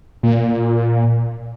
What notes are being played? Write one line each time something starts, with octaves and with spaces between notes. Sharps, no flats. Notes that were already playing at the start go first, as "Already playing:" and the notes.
A#2